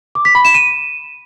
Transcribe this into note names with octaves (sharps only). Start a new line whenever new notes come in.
D6
B6
B5
E7
D#7